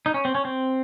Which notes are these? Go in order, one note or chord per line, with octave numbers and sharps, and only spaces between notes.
D#4
C#4
C4
C#4
C4